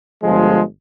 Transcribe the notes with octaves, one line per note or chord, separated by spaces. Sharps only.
G1 F3 G#3